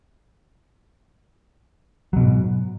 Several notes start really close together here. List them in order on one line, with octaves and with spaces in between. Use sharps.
F#3 B2 G#2